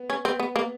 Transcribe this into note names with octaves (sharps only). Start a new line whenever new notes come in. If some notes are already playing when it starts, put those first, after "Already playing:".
Already playing: B3
C#4
B3 C4
B3
A#3